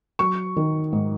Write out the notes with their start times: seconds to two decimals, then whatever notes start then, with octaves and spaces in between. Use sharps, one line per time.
0.19 F#3 C#6
0.57 D#3
0.92 G#2